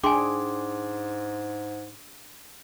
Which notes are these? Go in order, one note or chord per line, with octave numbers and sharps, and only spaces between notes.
G#2 D4 G#4 G5 G#5 C6 D6